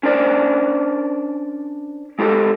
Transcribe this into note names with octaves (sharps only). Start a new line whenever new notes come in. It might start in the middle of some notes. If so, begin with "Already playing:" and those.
C#4 D4 A#4 C5 D5
G#3 F4 G4 A4